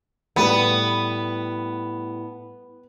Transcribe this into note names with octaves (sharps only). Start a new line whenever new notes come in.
A2 G3 B3 B4 B5